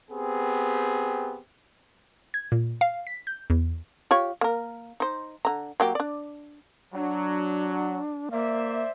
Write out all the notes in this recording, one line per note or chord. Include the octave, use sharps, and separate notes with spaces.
B3 C4 G4 G#4
G#6
A#2
F5
B6
G6
E2
F4 G4 C#5
A#3 A#4
D#4 C5
D3 A#5
F#3 A#3 G4
D4 D5
F#3 D4
A#3 C5 D5 E5